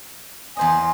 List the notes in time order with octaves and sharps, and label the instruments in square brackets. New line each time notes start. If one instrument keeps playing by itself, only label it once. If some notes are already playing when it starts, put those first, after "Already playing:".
[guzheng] E2 C5 D#5 [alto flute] G#5